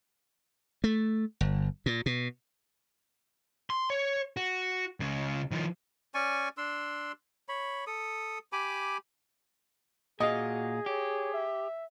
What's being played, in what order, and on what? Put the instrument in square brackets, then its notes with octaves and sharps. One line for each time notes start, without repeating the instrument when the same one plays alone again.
[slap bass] A3
G1
A#2
B2
[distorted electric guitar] C6
C#5
F#4
C#2 C#3
D#3 F3
[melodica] C#4 D5 G#5 C#6
D4 C6 E6
C#5 B5
A4 D#6
G4 G#5 B5 D6
[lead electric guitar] A#2 F5 [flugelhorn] F#4 [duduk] G#4 [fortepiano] D#5
[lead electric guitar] G4 [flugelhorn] C#5
[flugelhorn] E5